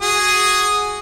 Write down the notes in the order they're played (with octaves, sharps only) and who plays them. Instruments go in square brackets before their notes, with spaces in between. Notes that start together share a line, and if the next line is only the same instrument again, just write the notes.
[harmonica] F#4 G#4 D#6